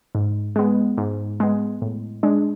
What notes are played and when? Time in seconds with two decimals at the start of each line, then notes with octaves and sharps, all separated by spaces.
0.15 G#2
0.56 G#3 B3
0.98 G#2
1.40 G#3 B3
1.82 A2
2.23 G#3 D4